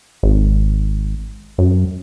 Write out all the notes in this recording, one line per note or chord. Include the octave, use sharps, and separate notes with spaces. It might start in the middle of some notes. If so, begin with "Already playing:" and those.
G#1
F#2